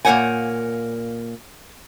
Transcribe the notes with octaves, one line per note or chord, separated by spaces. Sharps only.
A#2 A#3 A#4 C#5 F#5 G#5